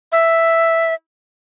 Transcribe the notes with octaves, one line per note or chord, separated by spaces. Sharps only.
E5